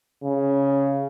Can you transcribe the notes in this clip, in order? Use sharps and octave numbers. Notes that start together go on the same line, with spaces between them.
C#3